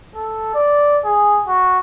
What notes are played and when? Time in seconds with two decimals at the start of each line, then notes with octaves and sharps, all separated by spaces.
0.16 A4
0.55 D5
1.05 G#4
1.47 F#4